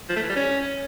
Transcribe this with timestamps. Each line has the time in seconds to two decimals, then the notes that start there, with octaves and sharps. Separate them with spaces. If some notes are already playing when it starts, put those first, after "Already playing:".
0.09 F3
0.16 A3
0.23 E3
0.29 G3
0.36 C#4